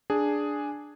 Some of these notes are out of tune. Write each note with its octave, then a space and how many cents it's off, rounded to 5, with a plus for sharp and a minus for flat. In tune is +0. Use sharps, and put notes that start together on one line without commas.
D4 +0 G#4 +0